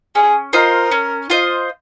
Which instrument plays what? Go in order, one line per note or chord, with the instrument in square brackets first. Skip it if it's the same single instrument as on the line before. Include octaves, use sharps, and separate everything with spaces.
[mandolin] C#4 [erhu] G#4
[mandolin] F4 C5 D#5 [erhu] A#4
[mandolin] C#4
F4 C5 D#5